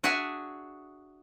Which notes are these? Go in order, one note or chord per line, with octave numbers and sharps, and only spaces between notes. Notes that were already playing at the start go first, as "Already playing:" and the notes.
D4 F#4 G#4 E5 F#5 G#5